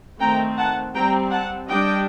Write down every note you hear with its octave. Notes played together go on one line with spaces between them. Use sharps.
D#3 A3 C4 G5 A#5
F#5 A5
G3 C4 G5 A#5
F#5 A5
G3 D4 D#5 G5